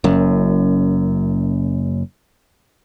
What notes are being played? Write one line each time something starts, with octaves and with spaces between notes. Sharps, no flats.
F#1 F#2